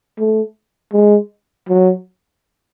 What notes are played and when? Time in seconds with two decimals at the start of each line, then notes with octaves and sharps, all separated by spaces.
0.18 A3
0.93 G#3
1.69 F#3